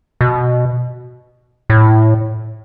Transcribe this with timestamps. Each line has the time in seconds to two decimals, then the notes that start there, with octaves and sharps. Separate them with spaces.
0.21 B2
1.70 A2